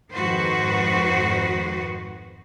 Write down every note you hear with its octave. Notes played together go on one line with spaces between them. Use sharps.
F2 G#2 D#3 F#4 B4 C5